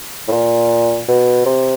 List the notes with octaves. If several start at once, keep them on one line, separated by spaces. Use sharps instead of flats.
A2
A#2
B2
C3